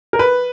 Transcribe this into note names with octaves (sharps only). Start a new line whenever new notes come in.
A#4
B4